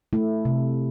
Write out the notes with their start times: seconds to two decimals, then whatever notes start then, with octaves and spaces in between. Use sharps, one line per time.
0.13 A3 E4
0.45 C3